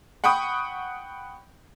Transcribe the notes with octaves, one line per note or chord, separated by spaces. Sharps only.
F#5 G5 B5 C#6 D#6